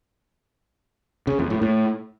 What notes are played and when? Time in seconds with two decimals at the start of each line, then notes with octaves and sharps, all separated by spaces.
1.27 C#3
1.39 F2
1.50 A2
1.62 A2